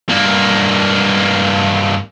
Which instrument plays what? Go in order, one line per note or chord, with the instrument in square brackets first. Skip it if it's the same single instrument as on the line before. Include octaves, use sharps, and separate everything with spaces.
[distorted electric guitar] G2 A#3